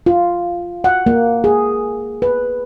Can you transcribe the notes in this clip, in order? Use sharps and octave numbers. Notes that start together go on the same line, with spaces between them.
F4
F#5
A#3
G#4
B4